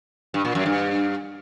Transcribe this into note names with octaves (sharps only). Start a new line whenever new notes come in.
G2
A#2
F#2
G2